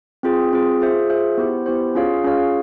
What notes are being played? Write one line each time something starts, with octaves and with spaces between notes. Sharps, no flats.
C4 F4 G#4
C4 F4 G#4
F4 G#4 C5 E5
F4 G#4 C5 E5
B3 E4 G4 C5
B3 E4 G4 C5
C#4 F4 G#4 C#5 F5
C#4 F4 G#4 C#5 F5